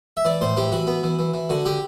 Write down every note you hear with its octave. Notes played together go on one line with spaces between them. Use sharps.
E5
E3 D5
A2 C5
E3 G4
E3 F#4
B3
E3
E3
E3
D3 F#4
D3 G4